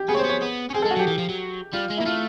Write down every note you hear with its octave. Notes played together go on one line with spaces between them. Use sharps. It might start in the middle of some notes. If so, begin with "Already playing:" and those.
Already playing: G4
B3 G#4
C4 C#5
C5
B3
C#5
B3
C#4
C4 G#4
A4
G#3
F#4
F#3
G4
E3
F3
F#3
G3 F4
G#3
A#3 E4
A3 F4